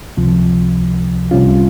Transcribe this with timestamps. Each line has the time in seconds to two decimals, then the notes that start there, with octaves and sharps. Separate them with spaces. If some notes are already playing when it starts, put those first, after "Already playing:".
0.17 C#2 C3 F3
1.31 C2 C3 G3 C#4 F4